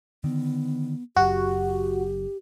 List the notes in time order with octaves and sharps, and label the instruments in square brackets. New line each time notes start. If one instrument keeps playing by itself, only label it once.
[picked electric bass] D3 D#3 [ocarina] B3
[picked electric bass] F#1 F#2 [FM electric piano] F#4 [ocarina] G4